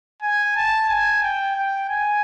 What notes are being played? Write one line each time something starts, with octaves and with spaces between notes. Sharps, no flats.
G#5
A5
G#5
G5
G5
G#5